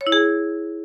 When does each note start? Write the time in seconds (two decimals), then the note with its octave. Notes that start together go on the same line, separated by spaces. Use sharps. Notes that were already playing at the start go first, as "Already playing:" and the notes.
0.01 C#5
0.07 E4
0.12 G#4